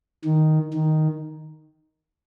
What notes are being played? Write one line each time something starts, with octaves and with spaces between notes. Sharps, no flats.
D#3
D#3